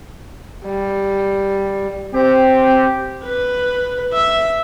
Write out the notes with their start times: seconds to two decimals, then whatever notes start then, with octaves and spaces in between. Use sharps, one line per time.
0.65 G3
2.14 C4 G4
3.25 B4
4.13 E5